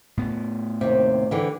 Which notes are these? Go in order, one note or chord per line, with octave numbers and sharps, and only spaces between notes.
A2 B3
D#2 C3
D3 E3 G4